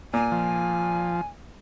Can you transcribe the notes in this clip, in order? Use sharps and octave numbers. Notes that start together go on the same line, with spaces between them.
A#2 G#5
F3